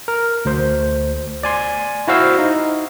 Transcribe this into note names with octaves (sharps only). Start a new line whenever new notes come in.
A#4
D2 C5
D5 G#5 C6
E4 F#4 C5 F5 E6
D#4